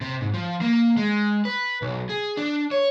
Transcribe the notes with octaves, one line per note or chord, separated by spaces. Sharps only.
C3
G#2
F3
A#3
G#3
B4
B1
G#4
D4
C#5